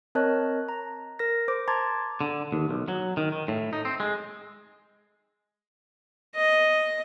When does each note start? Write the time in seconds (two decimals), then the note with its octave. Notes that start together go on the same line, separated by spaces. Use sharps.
0.15 C4 A#4 C#5 D#5 A5 F#6
0.69 A#5
1.19 A#4 A#6
1.48 C5 D6
1.68 A5 A#5 C6 D6 G#6 A6
2.21 D3
2.52 D#2
2.69 B1
2.88 F#3
3.17 D#3
3.32 D#3
3.48 A2
3.73 D#4
3.85 C4
4.00 G#3
6.35 D#5